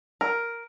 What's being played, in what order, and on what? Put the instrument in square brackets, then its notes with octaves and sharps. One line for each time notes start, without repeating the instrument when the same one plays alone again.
[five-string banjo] A#4